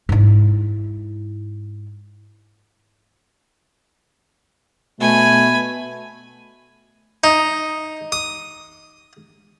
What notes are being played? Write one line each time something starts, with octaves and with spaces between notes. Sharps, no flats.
G#2 E4
B2 A3 G#5 B5
D#4
D#6